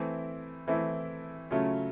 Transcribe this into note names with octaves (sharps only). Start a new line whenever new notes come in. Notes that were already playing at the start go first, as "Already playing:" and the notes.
Already playing: E3 A3 C4 E4
E3 A3 C4 E4
C#3 F#3 A3 C#4 F4